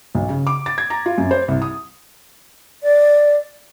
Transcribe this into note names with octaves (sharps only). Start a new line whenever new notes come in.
B1
C#3
D6
A6
G#6
A#5
F4
F#2
C5
C2
D#6
D5